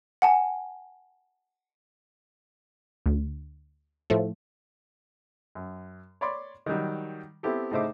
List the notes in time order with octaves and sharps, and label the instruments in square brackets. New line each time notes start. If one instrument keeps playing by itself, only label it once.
[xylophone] F#5 G#5 A5
[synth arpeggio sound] D2
A2 F3 A3
[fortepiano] F#2
C#5 D5 B5 C6 D6
D#3 F#3 G3
B3 C4 E4 G4 A4
A2 C#3 D#4 C5 E5 D6